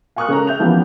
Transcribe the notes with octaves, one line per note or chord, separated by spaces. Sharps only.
F5 G#5 C#6 D#6 F6 F#6
C#3 G#3 C#4 A4 A#4 A#5
E5 G6 F7
E3 F3 A#3 B3 C#4 G4